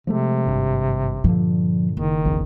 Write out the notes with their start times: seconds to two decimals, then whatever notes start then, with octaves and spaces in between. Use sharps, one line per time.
0.07 C3 F3 G#3 A3
0.47 G#1 G2
1.24 G2 A#2 D3 F3
1.97 F#1 D#3
2.25 A#1 E2 C#3